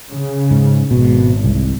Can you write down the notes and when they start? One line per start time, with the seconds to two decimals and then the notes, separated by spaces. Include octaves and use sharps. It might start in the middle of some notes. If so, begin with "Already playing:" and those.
0.10 C#3
0.51 G#2
0.91 G#1 B2
1.44 C2